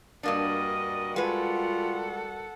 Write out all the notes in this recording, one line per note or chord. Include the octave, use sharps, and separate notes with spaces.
G2 G3 A#3 D4 F#4 A#4 D#5
G#3 F4 A4 B4 F#5